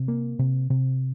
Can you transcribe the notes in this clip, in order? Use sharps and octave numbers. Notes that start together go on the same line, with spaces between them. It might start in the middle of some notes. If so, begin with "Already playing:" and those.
Already playing: C3
A#3
C3
C3